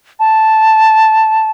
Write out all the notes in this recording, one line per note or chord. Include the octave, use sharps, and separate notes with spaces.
A5